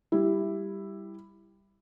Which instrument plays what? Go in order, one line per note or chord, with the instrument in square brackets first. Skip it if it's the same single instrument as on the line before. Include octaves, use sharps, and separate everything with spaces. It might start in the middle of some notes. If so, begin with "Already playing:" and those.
[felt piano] G3 E4